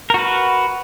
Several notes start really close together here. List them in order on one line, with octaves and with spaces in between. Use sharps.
A#4 F#4 B4